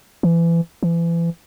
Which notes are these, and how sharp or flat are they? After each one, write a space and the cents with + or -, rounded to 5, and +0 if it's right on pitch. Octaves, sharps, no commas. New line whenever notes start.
E3 +30
E3 +35